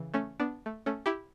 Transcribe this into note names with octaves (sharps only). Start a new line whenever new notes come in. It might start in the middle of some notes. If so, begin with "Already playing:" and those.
Already playing: C#3 E3
A3 C#4
B3 D4
A3
A3 C#4
E4 G4